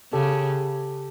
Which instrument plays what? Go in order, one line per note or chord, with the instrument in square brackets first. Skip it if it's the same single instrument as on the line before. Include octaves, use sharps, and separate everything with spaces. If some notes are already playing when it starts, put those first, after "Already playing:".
[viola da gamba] C#3 [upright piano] G4 A4